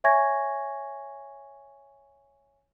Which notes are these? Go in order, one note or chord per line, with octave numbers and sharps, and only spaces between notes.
C#5 E5 G#5 C#6 G#6 A#6